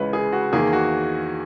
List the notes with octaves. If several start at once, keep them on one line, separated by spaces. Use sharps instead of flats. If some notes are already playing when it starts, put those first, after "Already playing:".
Already playing: C#2 C#3 E3 B4 D#5
G#4
F#4
E2 D#3 A#3 G#4
F#4